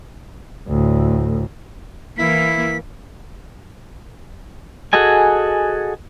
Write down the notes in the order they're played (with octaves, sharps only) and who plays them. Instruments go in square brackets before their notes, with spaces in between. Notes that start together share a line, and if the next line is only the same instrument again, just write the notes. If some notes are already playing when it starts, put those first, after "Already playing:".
[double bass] D2 A2
[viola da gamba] E3 A#3 [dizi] E4 [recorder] B6
[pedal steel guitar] F#4 G#4 A4 D#5 G#5